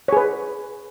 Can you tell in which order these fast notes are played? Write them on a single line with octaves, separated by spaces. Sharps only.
C#5 G#4 B4